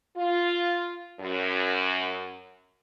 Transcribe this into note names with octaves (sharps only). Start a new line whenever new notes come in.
F4
F#2